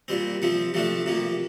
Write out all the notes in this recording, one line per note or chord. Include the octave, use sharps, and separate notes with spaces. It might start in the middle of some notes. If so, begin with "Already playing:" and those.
A#2 G3 C4
C3 F3 C4
C3 F3 A3 D4
C3 F3 A#3